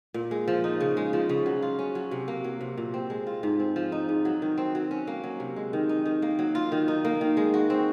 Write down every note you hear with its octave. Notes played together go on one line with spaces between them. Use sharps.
A#2
G#3
F3
D#4
C#3
G#3
F3
C#3
F#3
F4
C#4
F#3
C3
A#3
F#3
C3
A#2
C4
G#3
F4
G#2
C4
F3
D#4
G#2
F#3
D#3
C4
F#3
C#4
A#3
F#3
C3
G#3
D#3
D#4
D#3
A#3
F#3
F4
D#3
D#4
A#3
D#3
G#3
F#4
C4